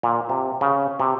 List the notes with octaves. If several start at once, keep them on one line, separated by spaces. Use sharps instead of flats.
A#2
C3
C#3
C3